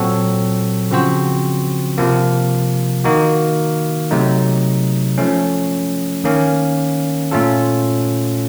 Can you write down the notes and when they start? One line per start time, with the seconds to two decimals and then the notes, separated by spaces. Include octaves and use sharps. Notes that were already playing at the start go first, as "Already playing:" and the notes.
Already playing: A#2 F#3 C4 F#4 A4
0.91 C#3 F3 C4 F#4 C5
1.98 C3 F3 A#3
3.04 D#3 A#3 D#4 F#4
4.11 C3 F#3 A3 D#4
5.18 F3 A3 C#4
6.24 D#3 A#3 C#4
7.31 A#2 A3 C#4 F4 A4